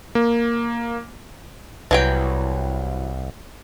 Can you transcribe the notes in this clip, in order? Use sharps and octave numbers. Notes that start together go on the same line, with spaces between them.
A#3
C2 E3 F#3 G5